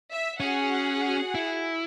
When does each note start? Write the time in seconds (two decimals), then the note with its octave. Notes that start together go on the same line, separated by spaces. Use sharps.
0.12 E5
0.40 C#4 F#4 G#4 F#5
1.35 E4